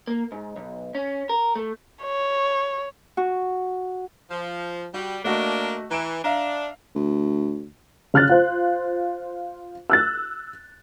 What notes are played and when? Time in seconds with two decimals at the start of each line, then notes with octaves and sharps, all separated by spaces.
0.07 A#3
0.32 G#2
0.56 B1
0.95 C#4
1.29 A#4
1.55 A3
2.04 C#5
3.17 F#4
4.31 F3
4.94 G3 F#4
5.25 A3 A#3 D4 F#4 D#5
5.91 E3 A#5 D7 E7
6.24 D4 E5 F5 A#5
6.95 D2
8.14 C#3 F6 F#6 A6
8.29 F4 C5
9.90 E6 F#6 A6